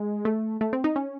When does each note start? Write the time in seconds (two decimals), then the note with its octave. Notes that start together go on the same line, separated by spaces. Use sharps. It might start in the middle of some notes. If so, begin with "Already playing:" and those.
Already playing: G#3
0.25 A3
0.61 A3
0.73 C4
0.84 D#4
0.96 C#4